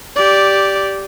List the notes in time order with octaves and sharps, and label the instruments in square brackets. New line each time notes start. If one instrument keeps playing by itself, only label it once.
[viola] G4 D5